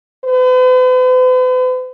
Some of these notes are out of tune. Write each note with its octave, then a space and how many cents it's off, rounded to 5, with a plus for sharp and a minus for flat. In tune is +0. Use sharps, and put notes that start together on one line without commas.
B4 +45